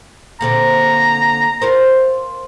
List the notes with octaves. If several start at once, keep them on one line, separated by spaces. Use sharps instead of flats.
A#2 D3 C4 A#5
F4 A#4 C5